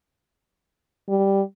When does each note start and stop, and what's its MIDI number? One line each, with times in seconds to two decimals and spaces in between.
1.09 1.41 55